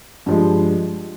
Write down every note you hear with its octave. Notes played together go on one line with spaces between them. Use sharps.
G2 F3 G#3